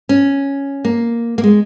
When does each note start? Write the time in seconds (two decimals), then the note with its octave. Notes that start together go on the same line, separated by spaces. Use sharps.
0.09 C#4
0.85 A#3
1.38 A#3
1.44 G#3